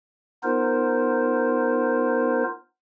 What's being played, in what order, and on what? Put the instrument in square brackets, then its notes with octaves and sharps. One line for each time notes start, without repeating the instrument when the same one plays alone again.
[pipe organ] B3 D#4 F4 A#4 C5